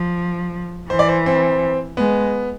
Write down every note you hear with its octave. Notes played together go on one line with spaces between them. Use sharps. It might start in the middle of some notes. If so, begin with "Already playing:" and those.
Already playing: F3
E3 C5
D5
C5
C4
G#3 B3